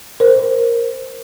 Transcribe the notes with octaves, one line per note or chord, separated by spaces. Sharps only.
A#4 C5